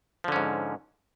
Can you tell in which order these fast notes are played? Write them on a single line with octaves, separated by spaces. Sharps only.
F3 D3 C#4 G#2